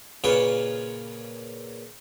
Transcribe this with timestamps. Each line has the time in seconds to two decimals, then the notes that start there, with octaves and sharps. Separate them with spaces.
0.24 A#2 C#3 F4 B4 C#5